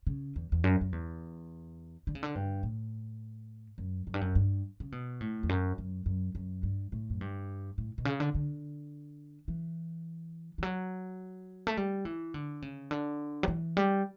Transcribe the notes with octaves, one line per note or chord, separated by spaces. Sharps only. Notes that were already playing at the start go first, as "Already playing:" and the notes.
C#3
E2
E2
F#2
F#2
E2
D3
C#3
D3
G2
A2
F#2
F#2
G2
F#2
G2
C#3
B2
A2
E2
F#2
F#2
F#2
F#2
G2
A2
F#2
G2
A2
B2
C#3
D3
D3
E3
E3
F#3
A3
G3
E3
D3
C#3
D3
F#3
E3
G3